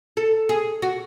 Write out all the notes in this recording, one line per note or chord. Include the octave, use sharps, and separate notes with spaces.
A4
G#4
F#4